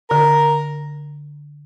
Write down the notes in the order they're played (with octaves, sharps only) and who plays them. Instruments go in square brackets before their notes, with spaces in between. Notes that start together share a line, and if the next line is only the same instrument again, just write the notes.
[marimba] D3 [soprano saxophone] A#4